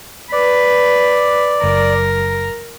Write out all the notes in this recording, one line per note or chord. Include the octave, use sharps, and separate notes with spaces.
B4 D5
F#1 A#4